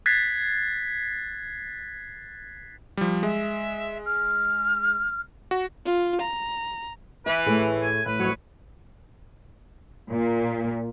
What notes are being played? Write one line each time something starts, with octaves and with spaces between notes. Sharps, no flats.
F#6 G#6 A6 B6 C7
F3 G3
G#3 E5
F6
F#4
F4
A#5
E3 B4 E5
A2 A3 G#4
G#5
A2 B4
F2 F#3 C#5
A#2